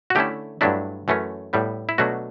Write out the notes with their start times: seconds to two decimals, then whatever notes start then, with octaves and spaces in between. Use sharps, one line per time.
0.10 F#4
0.15 D3 A3 C#4 E4 G4
0.61 G2 F#3 A3 D4 E4
1.08 F#2 E3 A3 C#4
1.53 A2 G3 B3
1.89 E4
1.98 B2 F#3 A3 D4 F#4